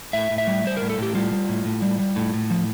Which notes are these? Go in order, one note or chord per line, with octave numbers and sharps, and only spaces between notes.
A2 E5
A2
E5
G3
G3 C5
A2 A#4
A4
A2 G4
G3 F4
G3
A2
A2
G3
G3
A2
A2
F3